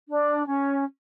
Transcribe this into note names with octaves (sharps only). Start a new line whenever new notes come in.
D4
C#4